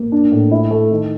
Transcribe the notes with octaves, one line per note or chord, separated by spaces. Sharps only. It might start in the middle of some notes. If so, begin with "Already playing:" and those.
Already playing: A#3
D4
A2
E4
A3
D#3